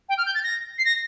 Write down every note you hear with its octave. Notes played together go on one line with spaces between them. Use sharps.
G5
F6
G6
A6
A#6
C7
A#6